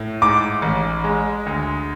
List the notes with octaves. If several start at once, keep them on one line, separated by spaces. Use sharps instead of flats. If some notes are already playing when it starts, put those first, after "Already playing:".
Already playing: A2
G#2 D6
A1
G#3
D2